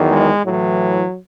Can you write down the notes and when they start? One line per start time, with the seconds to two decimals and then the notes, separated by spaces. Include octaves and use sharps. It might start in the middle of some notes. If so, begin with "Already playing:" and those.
Already playing: E2 D#3 F#3
0.08 G#3
0.44 A2 E3 F#3